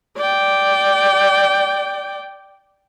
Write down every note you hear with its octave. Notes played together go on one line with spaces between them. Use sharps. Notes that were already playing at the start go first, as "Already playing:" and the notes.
D5 G5